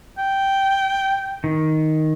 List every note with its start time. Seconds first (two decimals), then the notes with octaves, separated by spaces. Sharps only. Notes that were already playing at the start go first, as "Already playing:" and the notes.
0.18 G5
1.44 D#3